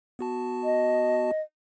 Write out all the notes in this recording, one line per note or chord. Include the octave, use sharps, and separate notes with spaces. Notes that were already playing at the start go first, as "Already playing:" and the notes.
B3 F#4 A5
D#5